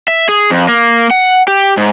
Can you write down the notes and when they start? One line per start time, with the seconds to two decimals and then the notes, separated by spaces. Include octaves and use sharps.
0.08 E5
0.29 G#4
0.50 F2
0.68 A#3
1.11 F#5
1.48 G4
1.77 G#2